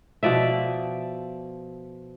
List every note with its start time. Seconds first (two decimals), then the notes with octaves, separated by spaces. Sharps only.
0.23 B2 F3 D5 E5